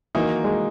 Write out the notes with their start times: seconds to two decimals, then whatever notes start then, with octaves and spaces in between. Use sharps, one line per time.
0.15 D#3 E3 F#3 A#3 D#4
0.44 G#3